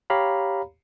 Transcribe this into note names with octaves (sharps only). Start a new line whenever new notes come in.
G4 C#5 F5 A#5 B5